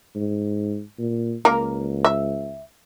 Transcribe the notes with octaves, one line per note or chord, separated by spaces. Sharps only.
G#2
A#2
C#2 A#3 A#4
E5